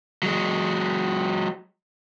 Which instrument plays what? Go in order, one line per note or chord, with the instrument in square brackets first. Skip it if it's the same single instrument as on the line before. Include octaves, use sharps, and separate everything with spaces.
[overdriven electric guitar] F#3 G#3